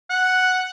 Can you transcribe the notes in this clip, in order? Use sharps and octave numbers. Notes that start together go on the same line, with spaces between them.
F#5